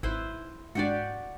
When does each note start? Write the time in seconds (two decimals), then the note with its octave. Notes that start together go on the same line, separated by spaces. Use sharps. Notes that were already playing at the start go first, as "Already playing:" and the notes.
0.03 G#1 E4 B4 C5
0.75 G#2 D4 F#4 G4 D5